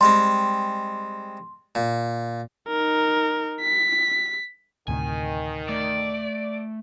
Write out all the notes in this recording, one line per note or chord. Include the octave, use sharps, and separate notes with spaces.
G3 G#3 C4 C6
A#2
D#4 A#4
B6
D2 A2 C3 D#3 G#5
A3 D5